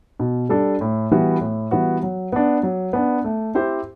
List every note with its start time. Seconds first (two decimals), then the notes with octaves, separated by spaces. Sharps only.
0.20 B2
0.49 G3 D4 A4
0.81 A2
1.11 E3 G3 B3 F#4
1.41 A2
1.71 E3 G3 B3 F#4
2.03 F#3
2.32 B3 D4
2.63 F#3
2.93 B3 D4
3.24 A3
3.54 C4 E4 G4 C5